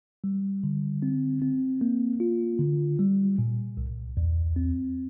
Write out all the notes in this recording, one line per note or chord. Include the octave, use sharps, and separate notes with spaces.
G3
D3
C4
C4
A#3
F4
D3
G3
A#2
C2
E2
C4